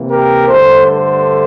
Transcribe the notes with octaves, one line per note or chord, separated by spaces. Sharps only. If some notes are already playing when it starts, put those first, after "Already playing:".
Already playing: C3 E3 A#3
G4 A#4
G2 D3 A3 A4 C5
A4 C5